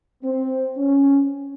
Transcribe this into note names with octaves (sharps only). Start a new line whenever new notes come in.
C4
C#4